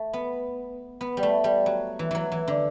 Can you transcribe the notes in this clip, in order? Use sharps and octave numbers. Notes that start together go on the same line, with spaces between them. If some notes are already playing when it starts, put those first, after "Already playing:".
Already playing: A3
B3
B3
G3
A3
G3
F#3
E3
E3 F#3
E3
D3